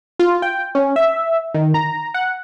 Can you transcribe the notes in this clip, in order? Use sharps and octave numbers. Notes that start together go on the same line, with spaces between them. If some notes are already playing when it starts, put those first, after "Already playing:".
F4
G5
C#4
E5
D#3
A#5
F#5